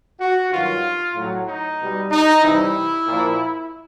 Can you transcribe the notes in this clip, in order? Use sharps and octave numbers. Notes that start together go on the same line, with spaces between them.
F#4
G2 D#3 F#3 F4
A2 F#3
D#4
B2 G3
D#4
C3 E3 G3 E4
A#2 F3